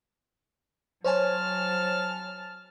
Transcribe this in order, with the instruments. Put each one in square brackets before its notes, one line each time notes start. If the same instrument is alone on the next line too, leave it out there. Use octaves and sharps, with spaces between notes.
[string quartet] F#3 A5 F6 [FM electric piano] C5 C#5 G#5